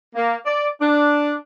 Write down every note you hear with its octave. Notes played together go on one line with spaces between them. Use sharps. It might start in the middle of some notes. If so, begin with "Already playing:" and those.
A#3
D5
D4